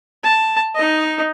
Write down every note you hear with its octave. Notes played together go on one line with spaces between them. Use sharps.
A5
D#4 D#5